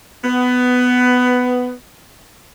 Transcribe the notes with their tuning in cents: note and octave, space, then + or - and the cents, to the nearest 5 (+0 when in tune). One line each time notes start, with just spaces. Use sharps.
B3 +15